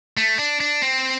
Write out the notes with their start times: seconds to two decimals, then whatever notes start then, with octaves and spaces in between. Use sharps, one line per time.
0.17 A3
0.38 D4
0.60 D4
0.82 C4